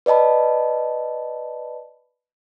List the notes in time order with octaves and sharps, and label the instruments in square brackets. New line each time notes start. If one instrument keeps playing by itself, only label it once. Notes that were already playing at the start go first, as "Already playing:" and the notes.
[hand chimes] B4 D5 D#5 A5 B5